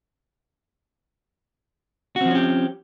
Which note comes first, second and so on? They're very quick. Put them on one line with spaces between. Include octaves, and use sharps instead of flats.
F#4 C4 F3 C#4 G4